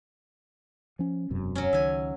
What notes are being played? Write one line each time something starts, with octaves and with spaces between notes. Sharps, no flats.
F3 C#4
E1 F#2 C3
F#3 C#4
C#2 D#3 E5 G#5